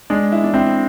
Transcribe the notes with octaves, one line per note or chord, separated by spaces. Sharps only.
G#3 D4
E4
D4
C4 E4